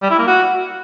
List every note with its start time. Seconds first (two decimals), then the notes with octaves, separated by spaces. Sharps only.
0.02 G3
0.11 E4
0.19 A#3
0.27 F#4